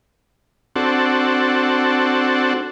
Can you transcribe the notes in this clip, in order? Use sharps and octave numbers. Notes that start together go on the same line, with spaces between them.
C4 D4 F#4 A4